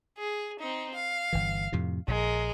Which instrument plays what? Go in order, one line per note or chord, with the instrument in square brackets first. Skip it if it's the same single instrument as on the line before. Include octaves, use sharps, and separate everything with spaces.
[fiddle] G#4
C4 D#4
F5
[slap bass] G1 E3
F2 A2 C3
[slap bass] A#1 [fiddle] G#3 A#4